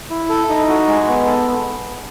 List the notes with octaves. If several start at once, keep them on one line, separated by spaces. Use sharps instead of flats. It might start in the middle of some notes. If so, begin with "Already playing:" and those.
E4
A4
D#4
F#4
G#3
B3
A4